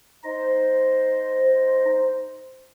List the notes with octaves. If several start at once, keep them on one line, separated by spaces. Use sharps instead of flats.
D#4 C5 D#5